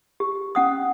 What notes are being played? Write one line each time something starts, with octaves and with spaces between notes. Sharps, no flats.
G4
C#4 F#5 D#6